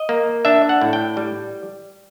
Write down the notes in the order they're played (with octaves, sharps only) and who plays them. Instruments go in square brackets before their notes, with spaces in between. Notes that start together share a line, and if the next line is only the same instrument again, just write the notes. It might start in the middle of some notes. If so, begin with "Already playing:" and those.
Already playing: [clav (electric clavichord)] D#5
A#3
D4 E5
F#5
A2
G5
G3